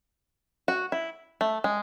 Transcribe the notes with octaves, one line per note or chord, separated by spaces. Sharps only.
F#4
E4
A3
G#3